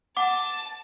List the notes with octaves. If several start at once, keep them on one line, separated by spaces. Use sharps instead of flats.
F#5 A5 D6